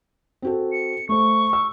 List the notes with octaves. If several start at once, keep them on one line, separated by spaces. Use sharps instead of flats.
C4 F#4 A4
C#7
A3 C5 C#6
E6